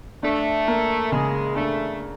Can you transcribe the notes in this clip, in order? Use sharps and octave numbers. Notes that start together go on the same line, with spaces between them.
A3 D4
A#3
C#3 G#3
A3 D4